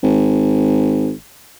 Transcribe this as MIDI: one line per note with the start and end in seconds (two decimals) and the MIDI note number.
0.03 1.12 32